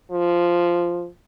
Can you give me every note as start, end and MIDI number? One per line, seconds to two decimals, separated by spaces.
0.11 1.07 53